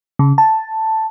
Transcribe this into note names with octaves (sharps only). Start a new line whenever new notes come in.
C#3
A5